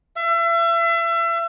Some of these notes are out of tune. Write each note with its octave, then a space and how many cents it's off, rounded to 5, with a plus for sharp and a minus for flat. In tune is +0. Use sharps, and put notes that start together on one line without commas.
E5 +35